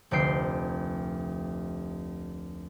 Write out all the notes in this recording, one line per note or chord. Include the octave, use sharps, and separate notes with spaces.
F1 D2 G5 C7